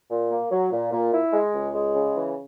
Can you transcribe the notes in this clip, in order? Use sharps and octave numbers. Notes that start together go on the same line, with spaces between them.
A#2
A#3
F#3
A#2
A#2
E4
G#3
C#2
G#3
C#3
E3